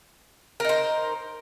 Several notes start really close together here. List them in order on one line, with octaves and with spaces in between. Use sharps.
A#4 D#4 C5